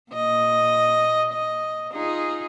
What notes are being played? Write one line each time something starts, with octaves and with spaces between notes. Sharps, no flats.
A#2 D#5
D#5
D#4 F4 G#4